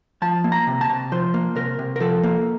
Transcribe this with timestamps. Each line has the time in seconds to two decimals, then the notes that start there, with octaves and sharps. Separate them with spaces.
0.22 F3 A5
0.44 A#3
0.52 A#5
0.67 C3
0.81 A5
0.90 C3
1.12 F3 C5
1.34 A#3
1.56 C3 A#4
1.79 C3
1.96 A#4
2.00 F3 A4
2.23 A#3